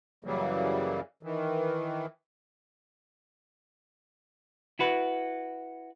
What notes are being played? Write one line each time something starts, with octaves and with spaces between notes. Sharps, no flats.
F#2 C#3 E3 F#3 G3 A#3
D#3 E3
E4 F#4 B4